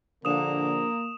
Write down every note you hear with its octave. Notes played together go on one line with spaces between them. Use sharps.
A#1 D3 A#3 D#6 E7